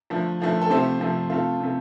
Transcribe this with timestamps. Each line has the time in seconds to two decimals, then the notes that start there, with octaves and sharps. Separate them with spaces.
0.10 D3 F3 A3
0.40 D3 F3 A3
0.61 A4
0.70 C3 F3 A3 G4 C5
1.00 C3 F3 A3
1.30 C3 A3 F4 A4
1.60 C3 A3